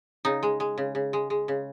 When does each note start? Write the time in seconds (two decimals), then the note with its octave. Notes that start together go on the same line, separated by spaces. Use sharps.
0.25 C#3 D#4
0.43 G#3
0.60 G#3
0.78 C#3
0.95 C#3
1.13 G#3
1.30 G#3
1.48 C#3